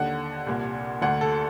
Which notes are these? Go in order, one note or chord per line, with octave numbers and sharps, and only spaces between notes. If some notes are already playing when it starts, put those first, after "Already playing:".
Already playing: D#2 D3 F#5
C2 A#2
D2 D3 F#5
A4